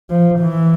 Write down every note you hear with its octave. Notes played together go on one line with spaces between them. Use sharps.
F3
E3